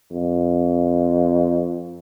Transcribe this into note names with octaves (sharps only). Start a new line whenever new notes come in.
F2